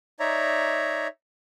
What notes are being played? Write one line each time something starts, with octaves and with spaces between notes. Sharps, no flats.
D#4 C#5 D5 E5 A#5